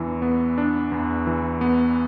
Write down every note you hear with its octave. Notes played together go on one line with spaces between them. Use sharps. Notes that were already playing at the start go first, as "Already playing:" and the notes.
Already playing: E2 E3 D4
B3
D4
E2
E3
B3